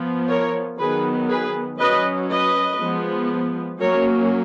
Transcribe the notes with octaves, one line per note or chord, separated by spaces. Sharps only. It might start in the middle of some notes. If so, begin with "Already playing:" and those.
Already playing: F3 B3
A#4 C#5
D#3 F#3 B3 G#4 B4
G#4 B4
F#3 C#4 B4 D#5
B4 D#5
F3 G#3 B3
F#3 A#3 C#4 A#4 C#5